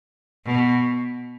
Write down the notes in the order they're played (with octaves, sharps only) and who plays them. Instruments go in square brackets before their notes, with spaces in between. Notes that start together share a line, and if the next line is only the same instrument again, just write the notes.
[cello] B2